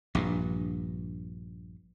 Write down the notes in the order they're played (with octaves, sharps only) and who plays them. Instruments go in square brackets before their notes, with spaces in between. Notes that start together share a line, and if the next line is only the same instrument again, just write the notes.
[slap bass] A#1 G2